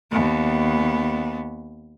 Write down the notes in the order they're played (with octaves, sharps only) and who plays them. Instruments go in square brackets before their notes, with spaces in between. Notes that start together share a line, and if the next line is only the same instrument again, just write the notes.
[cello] D#2 B3